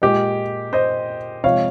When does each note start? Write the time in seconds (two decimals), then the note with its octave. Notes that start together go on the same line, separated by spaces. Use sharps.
0.02 A#2 G#3 G4
0.73 C5 D#5
1.44 C3 F3 G#3 C#5 F5